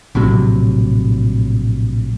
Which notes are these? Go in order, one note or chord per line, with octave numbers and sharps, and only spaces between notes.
A#1 A2 C3 F#3